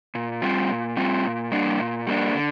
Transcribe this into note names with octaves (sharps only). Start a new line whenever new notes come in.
A#2
G3 C4 F4
A#2
G3 C4 F4
A#2
G3 A#3 D4
A#2
G3 A#3 D4
D3